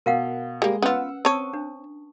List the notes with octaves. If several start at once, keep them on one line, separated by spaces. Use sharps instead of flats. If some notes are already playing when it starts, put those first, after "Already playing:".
B2 A#4 F5 F#5
G3 G#3 A#3
B3 C#4 F4 B4 F#5 E6
C4 C#5 A5 C#6 D#6
D4